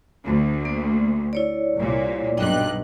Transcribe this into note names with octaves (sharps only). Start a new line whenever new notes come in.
D2
A#3
E4 C#5 D5
C2 A#2
B1 G2 D4 D#5 G5 F#6